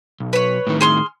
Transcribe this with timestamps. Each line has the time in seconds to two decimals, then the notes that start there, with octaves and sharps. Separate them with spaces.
0.20 B1
0.33 B4 C#5
0.67 A2 D#3
0.81 G#4 C6 F6